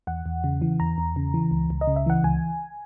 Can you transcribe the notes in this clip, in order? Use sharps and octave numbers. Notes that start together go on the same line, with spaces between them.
E2 F#5
E2
C#3
E3
E2 A#5
E2
C#3
E3
C#2
C#2
D#5
C#3
E5
E3 F#5
C#2 G#5